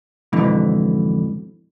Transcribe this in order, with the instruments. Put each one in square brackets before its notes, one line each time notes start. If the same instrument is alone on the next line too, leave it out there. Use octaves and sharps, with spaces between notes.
[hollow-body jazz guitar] F2 G#2 B2 D3 E3